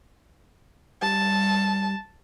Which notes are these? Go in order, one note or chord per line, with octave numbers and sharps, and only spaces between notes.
G3 A5